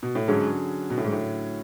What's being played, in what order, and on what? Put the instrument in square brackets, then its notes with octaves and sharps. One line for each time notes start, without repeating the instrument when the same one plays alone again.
[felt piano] B2
A2
[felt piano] G#2 [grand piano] D3 F#3 C#4 G#4
[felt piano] B2
A2
G#2
A2